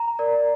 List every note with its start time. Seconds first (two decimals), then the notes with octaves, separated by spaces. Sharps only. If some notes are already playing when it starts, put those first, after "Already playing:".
Already playing: A#5
0.19 A#4 D5